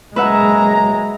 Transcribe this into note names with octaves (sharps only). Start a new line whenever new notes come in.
F#1 G#3 B4 E5 F#5 A#5